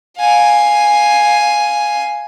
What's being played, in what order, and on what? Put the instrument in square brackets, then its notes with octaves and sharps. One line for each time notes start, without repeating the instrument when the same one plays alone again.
[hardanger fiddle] F5 G#5